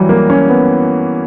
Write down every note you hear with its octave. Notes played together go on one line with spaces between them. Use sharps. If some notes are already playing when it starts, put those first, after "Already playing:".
Already playing: E3 F#3 G3
A#3
C#4
B3